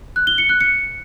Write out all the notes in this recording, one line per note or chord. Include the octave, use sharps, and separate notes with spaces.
F#6
G7
C#7
F#6
C#7